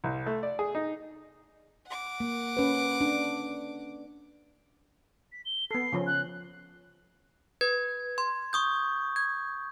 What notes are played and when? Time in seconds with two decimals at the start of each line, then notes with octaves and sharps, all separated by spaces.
0.04 C2
0.26 A3
0.43 D5
0.59 G#4
0.75 D#4
1.87 F#5 D6
2.20 A#3
2.57 C#4 B4
3.01 D4
5.32 B6
5.45 G7
5.71 B3 A4 C7
5.93 C#3 F3 C#4
6.07 F#6
7.61 B4 G#6
8.18 C6
8.53 C#6 D#6 G6
9.16 G#6